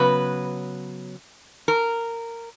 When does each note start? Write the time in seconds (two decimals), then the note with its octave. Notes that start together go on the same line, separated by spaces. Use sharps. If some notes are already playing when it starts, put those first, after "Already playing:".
Already playing: C#3 F#3 B3 B4
1.68 A#4